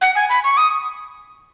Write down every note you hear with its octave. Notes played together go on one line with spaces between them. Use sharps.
F#5
G#5
B5
C#6
D#6